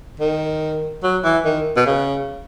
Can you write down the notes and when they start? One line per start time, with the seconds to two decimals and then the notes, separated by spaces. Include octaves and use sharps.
0.20 D#3
1.03 F#3
1.24 E3
1.45 D#3
1.76 B2
1.86 C#3